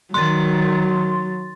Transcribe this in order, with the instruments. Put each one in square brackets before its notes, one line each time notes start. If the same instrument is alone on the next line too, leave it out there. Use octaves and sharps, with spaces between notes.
[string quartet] D#3 [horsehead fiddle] F#3 [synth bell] C6 A6